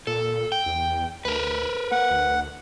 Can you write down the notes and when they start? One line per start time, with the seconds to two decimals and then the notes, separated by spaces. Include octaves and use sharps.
0.07 A#2 A4
0.52 G5
0.66 E2
1.25 D2 A#4 B4
1.91 A#3 F#5
2.11 D2